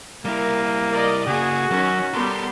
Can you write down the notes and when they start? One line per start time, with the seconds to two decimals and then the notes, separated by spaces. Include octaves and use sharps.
0.25 G3 A#3 E4 A#4
0.92 A#4 D5 D#5
1.27 C#3 A#3 F#4 G#4
1.71 D#3 F#3 C#4
2.14 G3 B3 A4 A#4 C6